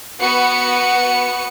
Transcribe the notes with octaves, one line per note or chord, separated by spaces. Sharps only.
B3 F#4 B4 C#7